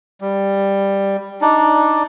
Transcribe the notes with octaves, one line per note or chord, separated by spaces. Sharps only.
G3
D4 D#4 D5